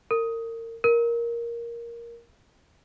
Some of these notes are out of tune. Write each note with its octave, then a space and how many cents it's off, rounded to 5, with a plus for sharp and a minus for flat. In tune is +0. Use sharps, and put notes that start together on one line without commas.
A#4 -30
A#4 +5